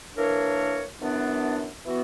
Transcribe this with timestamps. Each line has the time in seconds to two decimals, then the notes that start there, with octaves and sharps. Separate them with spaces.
0.16 E3 A#3 D4 A#4 C#5
1.01 F#2 E3 B3 D4
1.85 E3 B3 F#4